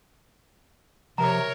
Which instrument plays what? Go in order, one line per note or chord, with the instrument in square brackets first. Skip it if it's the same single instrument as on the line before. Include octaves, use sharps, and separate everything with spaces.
[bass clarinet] C3 [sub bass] F3 [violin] A#4 C#5 [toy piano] A#5